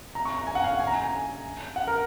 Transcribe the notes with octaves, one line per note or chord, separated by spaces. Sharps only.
A#5
C#6
A#5
G#5
F#5
F5
F#5
G#5
A#5
G#5
F#5
A#4